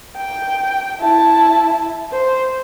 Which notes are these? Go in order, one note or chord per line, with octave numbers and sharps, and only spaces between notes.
G5
E4 A5
C5